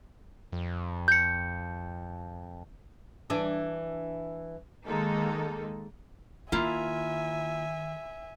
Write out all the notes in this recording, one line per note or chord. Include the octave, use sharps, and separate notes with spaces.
F2
G6 C#7
E3 D4
D#3 G#3 A#3 D#4 A4
D#3 A#3 E4 F4 E5 G#5